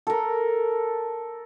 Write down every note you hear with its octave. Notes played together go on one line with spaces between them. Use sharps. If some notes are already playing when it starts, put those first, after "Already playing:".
A4 A#4